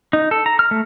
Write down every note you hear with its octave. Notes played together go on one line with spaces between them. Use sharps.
D#4
A4
A#5
F6
A3